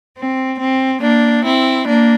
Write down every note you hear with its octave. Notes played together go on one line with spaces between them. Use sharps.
C4
C4
A#3 D4
C4 E4
A#3 D4